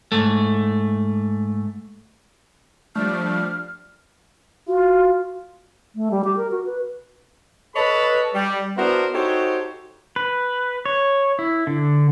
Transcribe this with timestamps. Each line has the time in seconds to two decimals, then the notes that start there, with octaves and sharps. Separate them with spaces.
0.12 G#2 A3
2.95 F3 G3 A3 D4 F6
4.67 F4 F#4
5.95 A3
6.11 G3
6.24 G4
6.37 A#4
6.51 F#4
6.66 B4
7.76 A4 B4 C#5 D#5 A5 B5
8.35 G3
8.77 B3 D4 E4 F#4 A#4 C5
9.15 D#4 F#4 G4 A4 C5 C#5
10.16 B4
10.86 C#5
11.39 E4
11.67 D3